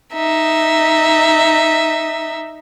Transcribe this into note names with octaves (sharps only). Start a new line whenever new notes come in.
D#4 E5